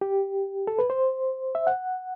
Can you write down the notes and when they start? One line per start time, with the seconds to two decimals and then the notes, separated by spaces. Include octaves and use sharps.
0.01 G4
0.67 A4
0.79 B4
0.90 C5
1.55 E5
1.67 F#5